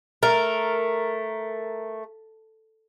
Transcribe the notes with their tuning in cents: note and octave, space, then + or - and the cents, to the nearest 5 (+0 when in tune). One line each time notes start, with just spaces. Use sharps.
A3 +0 A#4 +0